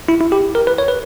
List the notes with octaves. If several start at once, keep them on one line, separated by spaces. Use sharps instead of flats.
E4
E4
G4
A#4
B4
C#5
B4